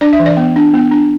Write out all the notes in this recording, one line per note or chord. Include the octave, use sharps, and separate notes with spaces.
D4 D5
E5
E3
D5
B3
D4
B3
D4